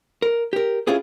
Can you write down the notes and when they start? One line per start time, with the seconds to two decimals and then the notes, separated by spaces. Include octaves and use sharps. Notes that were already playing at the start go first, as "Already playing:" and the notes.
0.22 A#4
0.53 G4 A#4
0.87 C#4 E4 F4 G4 G#4 B4